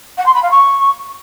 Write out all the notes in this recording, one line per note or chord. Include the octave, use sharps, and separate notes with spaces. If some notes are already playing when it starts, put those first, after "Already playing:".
F#5
C6
B5
F5
C#6